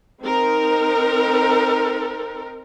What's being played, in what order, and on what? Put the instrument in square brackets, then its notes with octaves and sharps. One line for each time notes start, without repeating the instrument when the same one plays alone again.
[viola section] C4 D#4 A#4